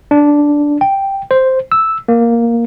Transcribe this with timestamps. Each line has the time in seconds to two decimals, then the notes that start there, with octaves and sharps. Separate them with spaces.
0.11 D4
0.81 G5
1.31 C5
1.72 E6
2.08 A#3